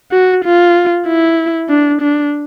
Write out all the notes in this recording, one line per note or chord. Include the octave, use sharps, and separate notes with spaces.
F#4
F4
E4
D4
D4